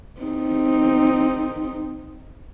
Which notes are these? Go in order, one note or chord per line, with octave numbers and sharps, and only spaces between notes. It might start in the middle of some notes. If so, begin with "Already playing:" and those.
C4 D#4